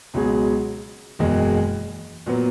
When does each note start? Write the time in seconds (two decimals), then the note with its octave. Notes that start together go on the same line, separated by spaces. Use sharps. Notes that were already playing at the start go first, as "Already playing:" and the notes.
0.14 C#2 B2 F#3 C#4 G#4
1.19 F#1 E2 B2 G#3
2.26 A#2 F#3 B3